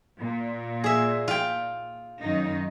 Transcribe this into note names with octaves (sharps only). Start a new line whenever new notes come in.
A#2
G#4 E5
F4 G5
F#2 D#3 D#4